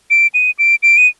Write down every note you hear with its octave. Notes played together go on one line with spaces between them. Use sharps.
D7
D#7
D7
D7
D#7